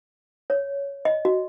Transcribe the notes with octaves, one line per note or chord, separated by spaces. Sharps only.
C#5
D#5
F#4